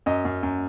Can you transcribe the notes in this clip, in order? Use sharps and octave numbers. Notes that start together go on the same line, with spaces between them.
F#2 D#5
F#2
F#2